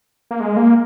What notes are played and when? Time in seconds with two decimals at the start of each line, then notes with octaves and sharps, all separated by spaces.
0.31 A#3
0.40 G#3
0.57 A#3